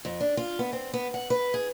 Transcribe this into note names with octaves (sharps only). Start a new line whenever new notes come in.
F2
D4
F4
B3
C4
B3
F#5
B4
G#4